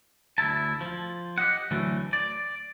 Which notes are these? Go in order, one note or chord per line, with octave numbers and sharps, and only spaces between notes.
D2 G#2 E4 A5
F3
G4 D#5 F#5
D2 E3 F#3 A3
D5